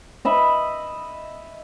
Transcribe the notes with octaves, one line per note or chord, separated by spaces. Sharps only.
D#5 E5 B5